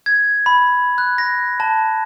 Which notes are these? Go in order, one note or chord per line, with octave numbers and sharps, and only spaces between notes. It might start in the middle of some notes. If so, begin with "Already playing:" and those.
G#6
B5
F#6
A#6
A5